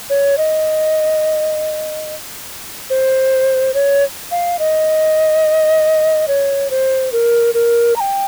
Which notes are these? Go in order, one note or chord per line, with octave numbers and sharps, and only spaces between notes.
C#5
D#5
C5
C#5
F5
D#5
C#5
C5
A#4
A#4
A#5
G5